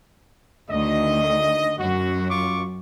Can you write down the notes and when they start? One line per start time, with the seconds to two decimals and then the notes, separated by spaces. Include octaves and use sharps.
0.70 D2 D#3 D#5
1.78 F#2 F#4
2.30 F4 C#6 D6